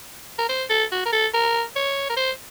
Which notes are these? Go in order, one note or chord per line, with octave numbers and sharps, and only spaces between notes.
A#4
C5
A4
F#4
A#4
A4
A#4
C#5
A#4
C5